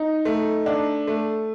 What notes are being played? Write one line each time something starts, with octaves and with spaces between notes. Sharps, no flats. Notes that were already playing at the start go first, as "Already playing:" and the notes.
Already playing: D#4
A3
D4
A3